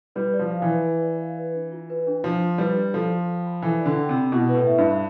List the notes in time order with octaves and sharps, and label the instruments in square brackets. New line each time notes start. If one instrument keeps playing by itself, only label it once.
[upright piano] G3 [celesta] B4
[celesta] D5
[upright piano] F3
[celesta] F5
[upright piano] E3
[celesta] B4
B4
D5
F5
B4
D4
F4
B4
D4
[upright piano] F3 [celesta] D4
[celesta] F4
[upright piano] G3 [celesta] B4
[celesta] D4
[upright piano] F3 [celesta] A4
[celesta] D5
G5
B5
[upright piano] E3 [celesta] A4
[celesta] D5
[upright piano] D3
[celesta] G5
[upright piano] C3
[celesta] B5
[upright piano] B2 [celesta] E4
[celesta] B4
[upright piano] A2
[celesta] E5
[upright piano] G2
[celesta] B5